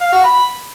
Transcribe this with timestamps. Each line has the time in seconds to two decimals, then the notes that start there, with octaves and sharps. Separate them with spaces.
0.01 F5
0.12 F#4
0.24 B5